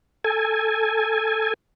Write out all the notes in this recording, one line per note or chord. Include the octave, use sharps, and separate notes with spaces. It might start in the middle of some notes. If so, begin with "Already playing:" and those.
A4 G#5